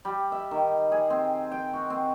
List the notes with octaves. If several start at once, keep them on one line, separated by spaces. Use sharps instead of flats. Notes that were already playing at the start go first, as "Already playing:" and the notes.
G3
E5
D#3
G#4
C4
G5
F#4
C4